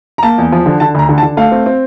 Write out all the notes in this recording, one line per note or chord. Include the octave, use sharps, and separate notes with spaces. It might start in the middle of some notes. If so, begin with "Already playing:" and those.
A#5
A#3 A5
E2
F3
D3
D3 A5
D2 A#5
D3
A5
D3
A3 F5
C4
C4